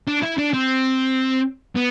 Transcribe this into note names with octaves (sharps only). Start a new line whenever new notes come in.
D4
E4
D4
C4
B3